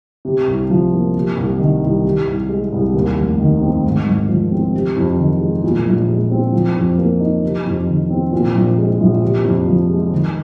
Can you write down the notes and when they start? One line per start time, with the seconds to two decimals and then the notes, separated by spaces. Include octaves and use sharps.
0.25 C3
0.47 C2
0.70 F3
0.93 A#3
1.15 C3
1.37 C2
1.59 D#3
1.83 C2
2.04 C3
2.27 C2
2.49 G#3
2.72 C2
2.94 D#2
3.17 F1
3.39 D#3
3.61 C4
3.84 G#2
4.06 G#1
4.29 F3
4.52 C4
4.73 C3
4.96 F2
5.18 D#3
5.40 G#3
5.64 A#2
5.86 A#1
6.09 G#3
6.31 C4
6.53 F3
6.76 F2
6.98 A#3
7.20 D#4
7.43 C3
7.66 F2
7.88 D#3
8.10 C4
8.33 A#2
8.55 A#1
8.78 G#3
9.00 A#1
9.23 C3
9.45 F2
9.67 F3
9.90 G#3
10.11 D#3